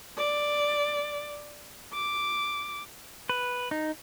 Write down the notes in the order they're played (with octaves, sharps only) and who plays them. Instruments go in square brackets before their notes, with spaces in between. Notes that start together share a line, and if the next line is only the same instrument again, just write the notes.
[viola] D5
D6
[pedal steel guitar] B4
D#4